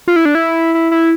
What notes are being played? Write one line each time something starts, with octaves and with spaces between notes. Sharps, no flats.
F4
E4
D4
E4
E4
E4